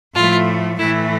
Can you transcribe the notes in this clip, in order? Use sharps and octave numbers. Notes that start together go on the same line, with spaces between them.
A2 F3 A3 F4
A2 E3 A3 E4